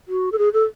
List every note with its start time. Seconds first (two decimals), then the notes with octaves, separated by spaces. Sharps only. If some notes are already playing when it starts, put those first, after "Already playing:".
0.08 F#4
0.32 A4
0.38 G#4
0.53 A4